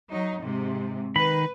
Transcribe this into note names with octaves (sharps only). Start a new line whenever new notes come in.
F#3 D#4
G#2 C3
D#3 B4 B5